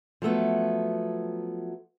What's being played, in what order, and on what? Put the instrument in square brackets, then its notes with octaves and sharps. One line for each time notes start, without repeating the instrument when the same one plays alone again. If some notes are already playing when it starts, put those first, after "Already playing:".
[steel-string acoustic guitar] F3 F#3 A3 B3